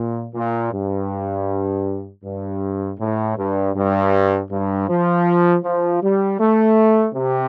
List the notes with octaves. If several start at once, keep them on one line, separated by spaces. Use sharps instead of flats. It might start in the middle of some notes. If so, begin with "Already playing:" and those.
Already playing: A#2
A#2
G2
G2
A2
G2
G2
G2
F3
F3
G3
A3
C3